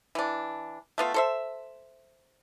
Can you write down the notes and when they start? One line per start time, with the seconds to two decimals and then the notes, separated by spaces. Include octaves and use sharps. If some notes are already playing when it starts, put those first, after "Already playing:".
0.15 E3 D4
0.98 A3 B3 F4
1.14 A4 C5 E5